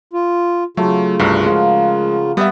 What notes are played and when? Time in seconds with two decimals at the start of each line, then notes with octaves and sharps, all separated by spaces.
0.13 F4
0.77 C#3 F#3 A3 F4
1.19 C2 G2 F#4 A#4
1.46 F3 G#3
2.37 G3 B3 E5